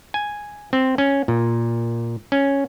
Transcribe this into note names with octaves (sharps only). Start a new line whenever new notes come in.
G#5
C4
C#4
A#2
C#4